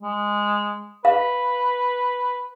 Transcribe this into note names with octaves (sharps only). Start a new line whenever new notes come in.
G#3
B4 F5